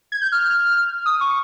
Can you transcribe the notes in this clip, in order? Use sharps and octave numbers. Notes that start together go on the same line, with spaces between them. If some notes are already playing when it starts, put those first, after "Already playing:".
G#6
G6
F6
D#6
C#6